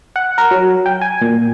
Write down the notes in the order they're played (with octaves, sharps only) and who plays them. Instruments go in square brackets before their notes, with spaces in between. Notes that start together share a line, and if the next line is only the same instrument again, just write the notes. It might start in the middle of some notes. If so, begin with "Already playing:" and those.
[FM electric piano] F#5
A#4
F#3
G5
G#5
A#2